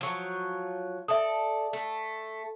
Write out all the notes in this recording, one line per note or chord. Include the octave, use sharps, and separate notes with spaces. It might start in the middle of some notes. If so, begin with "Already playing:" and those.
F3 F#3
A4 D5 E5 D#6
A3